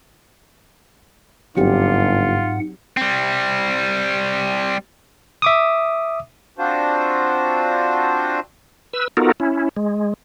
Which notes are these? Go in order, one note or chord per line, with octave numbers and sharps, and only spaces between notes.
G1 G#2 F#3 C4 F4 G4 F#5
G3 C4
E5 D6 D#6
C4 D4 F4 F#4 C5
B4 E6
B3 D#4 F4 F#4 A4 A#4
C#4 E4
G#3